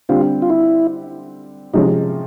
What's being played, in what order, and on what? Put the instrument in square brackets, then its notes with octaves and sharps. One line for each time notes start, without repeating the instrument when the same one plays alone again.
[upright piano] D3 G3 C4 [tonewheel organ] F4
[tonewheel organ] F4
E4
[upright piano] C3 F3 G#3 C#4 [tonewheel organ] D#4